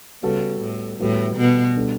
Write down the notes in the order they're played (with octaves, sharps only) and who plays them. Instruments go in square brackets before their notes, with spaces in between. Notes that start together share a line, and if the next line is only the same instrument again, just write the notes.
[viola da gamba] C#3 [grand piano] G3 B3 F#4 A4
[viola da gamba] A2
[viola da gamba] A2 [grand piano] E3 G3 B3 F#4 A4
[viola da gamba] B2
[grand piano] G3 D4 A4